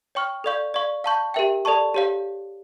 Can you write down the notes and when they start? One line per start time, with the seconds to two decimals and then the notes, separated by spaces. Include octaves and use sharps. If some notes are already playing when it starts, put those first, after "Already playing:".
0.15 C#5 G5 C#6 F6
0.44 A4 D5 F5 C#6 G6
0.74 D5 F5 C#6
1.04 F5 A5 C#6 G6
1.34 G4 A#4 E5 G5
1.65 A4 D5 A5 C#6
1.94 G4 C#5 F5